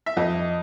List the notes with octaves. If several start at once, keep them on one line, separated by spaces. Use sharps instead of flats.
E5
F2 D#5